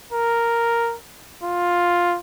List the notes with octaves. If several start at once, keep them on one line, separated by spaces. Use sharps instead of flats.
A#4
F4